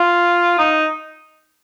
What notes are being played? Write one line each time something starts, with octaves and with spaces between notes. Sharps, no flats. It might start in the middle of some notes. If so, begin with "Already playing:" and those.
Already playing: F4
D#4